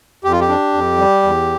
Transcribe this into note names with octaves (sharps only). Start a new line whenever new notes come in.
F2 G4
F4
G4
D4
F2
G3
E2